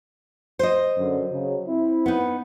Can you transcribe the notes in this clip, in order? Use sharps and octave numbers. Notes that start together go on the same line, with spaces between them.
C5 D#5
F#2 D3
C#3 F#3
C4 E4
B3 D#4